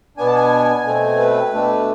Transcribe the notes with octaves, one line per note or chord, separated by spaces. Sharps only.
B2 B3 D4 G#5
A5
G#5
B2 A3 C4
B4
B2 A3 D4